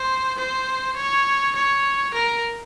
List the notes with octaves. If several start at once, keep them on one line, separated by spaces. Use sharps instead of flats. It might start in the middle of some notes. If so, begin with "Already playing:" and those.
Already playing: C5
C5
C#5
C#5
A#4